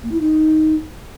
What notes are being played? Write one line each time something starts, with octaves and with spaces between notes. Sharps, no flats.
A#3
E4
D#4